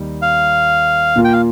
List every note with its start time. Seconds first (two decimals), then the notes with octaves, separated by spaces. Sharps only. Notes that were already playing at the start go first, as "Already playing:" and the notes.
Already playing: D#2 G3 D#4
0.22 F5
1.16 A#2 A#3 F4
1.25 G5
1.33 F5